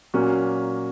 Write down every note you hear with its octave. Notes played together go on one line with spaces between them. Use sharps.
A#2 F#3 A#3 C#4 F#4